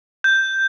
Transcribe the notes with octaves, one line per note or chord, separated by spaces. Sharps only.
G6